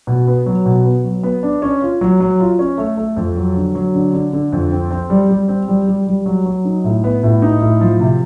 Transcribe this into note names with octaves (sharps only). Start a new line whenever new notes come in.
B2
B3
F#3
B2
B3
F#3
B3
D4
C#4
F4
F#3
F#3
F4
C#4
A3
A3
F2
F#3
D3
F#3
D3
D3
D3
F2
C4
C4
G3
G3
C4
G3
G3
G3
F#3
F#3
D#4
A2
B3
A2
D#4
A2
F3
C3